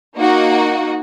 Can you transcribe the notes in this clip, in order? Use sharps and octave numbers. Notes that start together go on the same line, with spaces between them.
A#3 D#4 F#4